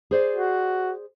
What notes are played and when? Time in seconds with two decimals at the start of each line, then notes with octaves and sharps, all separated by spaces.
0.11 G#4 C5 D5
0.35 F#4